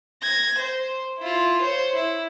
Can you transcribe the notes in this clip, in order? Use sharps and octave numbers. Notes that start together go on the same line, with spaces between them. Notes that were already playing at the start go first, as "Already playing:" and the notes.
G#6 A#6
C5
E4 F4
C5 C#5
E4